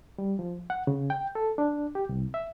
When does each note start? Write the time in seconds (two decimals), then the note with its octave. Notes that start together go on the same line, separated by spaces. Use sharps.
0.18 G3
0.39 F3
0.70 F#5
0.87 C#3
1.10 G5
1.35 A4
1.58 D4
1.95 G4
2.09 C2
2.34 E5